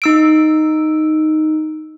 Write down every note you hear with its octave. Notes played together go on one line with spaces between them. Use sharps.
D#4 E6 D7